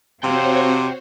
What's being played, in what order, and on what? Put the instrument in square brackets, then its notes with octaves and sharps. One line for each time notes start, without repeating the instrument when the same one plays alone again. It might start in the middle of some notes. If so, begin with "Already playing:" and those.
[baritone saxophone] C3 [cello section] C4 [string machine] F#4 C5 C#5 [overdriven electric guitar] F5 G5